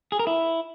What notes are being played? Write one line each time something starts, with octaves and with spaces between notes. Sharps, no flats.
G#4
A#4
E4